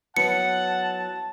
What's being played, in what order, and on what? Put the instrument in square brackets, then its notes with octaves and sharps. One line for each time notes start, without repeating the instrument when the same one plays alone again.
[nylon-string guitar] F#3 B3 E4 [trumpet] F#5 [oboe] A5 [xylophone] C#7